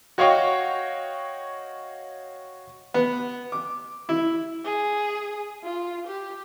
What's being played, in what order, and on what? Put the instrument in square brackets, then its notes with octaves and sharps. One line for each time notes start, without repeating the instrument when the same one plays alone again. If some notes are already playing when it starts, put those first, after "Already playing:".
[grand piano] F#4 C#5 D#5 F5 G5 C#6
[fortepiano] B3
D6
E4
[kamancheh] G#4
F4
G4